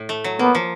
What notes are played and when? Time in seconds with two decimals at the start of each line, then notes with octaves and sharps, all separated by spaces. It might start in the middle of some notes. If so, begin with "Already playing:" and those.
Already playing: A2
0.09 A3
0.24 F#3
0.39 A#3 B3
0.55 F3